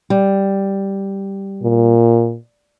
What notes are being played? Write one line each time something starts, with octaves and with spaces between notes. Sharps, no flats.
G3
A#2